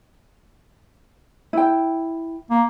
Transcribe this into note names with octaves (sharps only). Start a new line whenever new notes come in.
E4 G5
A#3